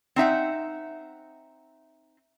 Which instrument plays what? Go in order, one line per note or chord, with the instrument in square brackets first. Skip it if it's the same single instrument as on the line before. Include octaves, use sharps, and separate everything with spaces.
[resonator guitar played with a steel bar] C4 D#4 E5 F#5